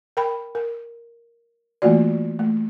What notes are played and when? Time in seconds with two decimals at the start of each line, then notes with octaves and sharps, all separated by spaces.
0.17 A#4 G5 B5
0.55 A#4
1.82 E3 A3 A#3 F4 F#4 D5
2.39 A3